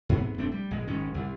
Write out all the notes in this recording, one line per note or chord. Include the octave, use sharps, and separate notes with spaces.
G#2 C3 B3
F1 A3 C4 D4
G3
A#1 G#3
G#1 G#2 C#4
C2